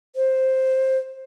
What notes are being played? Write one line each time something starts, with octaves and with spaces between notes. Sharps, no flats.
C5